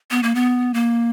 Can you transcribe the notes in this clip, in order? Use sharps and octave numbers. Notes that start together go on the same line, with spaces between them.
B3
A#3
B3
A#3